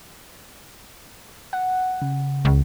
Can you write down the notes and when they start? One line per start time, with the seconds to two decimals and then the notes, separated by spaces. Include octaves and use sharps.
1.53 F#5
2.02 C#3
2.45 C#2